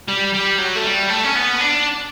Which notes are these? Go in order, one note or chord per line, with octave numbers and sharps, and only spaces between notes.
G3
G3
F#3
A3
G3
A3
C#4
B3
D4